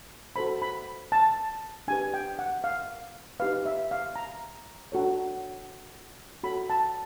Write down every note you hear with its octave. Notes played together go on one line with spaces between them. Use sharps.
F#4 A4 C5 B5
B5
A5
D4 G4 B4 G#5
G5
F#5
F5
D#4 G4 B4 F5
E5
F5
A#5
D4 F#4 A4 C#5
F#4 A4 C#5 B5
A5